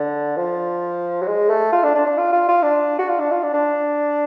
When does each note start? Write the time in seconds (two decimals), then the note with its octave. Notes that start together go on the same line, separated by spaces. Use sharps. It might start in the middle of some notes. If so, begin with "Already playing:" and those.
Already playing: D3
0.36 F3
1.22 F#3
1.27 G#3
1.49 A3
1.72 F4
1.83 D4
1.95 D4
2.06 D4
2.17 F4
2.32 F4
2.48 F4
2.62 D4
2.99 F#4
3.08 F4
3.19 D4
3.31 F4
3.43 D4
3.53 D4